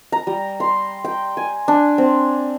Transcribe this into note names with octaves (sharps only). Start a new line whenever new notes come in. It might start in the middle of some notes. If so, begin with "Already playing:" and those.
A#5
G3
C6
G5
G#5
D4
C4